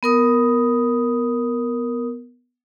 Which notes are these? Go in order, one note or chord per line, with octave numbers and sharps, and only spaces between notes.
B3 A#4 D#6